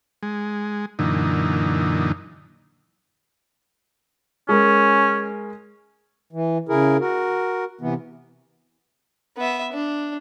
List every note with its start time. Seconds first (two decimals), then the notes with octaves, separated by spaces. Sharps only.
0.23 G#3
0.99 F#2 A#2 D3 E3 D#4
4.49 G#3 C#4 A#4
6.33 E3
6.69 C#3 E4 G#4 A#4
7.00 F#4 A#4
7.81 C3 E3 B3
9.37 B3 E5
9.73 D4